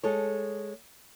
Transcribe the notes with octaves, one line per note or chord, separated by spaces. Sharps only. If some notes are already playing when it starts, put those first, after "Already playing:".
G#3 A4 C#5